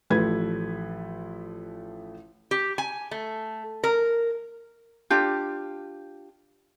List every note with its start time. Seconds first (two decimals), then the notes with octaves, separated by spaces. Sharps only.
0.10 A1 F3 A3 B4 G#6
2.51 G4
2.78 G#5
3.11 A3
3.84 A#4
5.10 D4 F4 G4